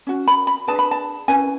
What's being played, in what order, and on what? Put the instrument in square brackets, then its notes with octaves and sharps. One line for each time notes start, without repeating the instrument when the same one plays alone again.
[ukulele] C#4 F#4
B5
B5
D4 G#4 B4 A5
B5
A5
C#4 E4 B4 G#5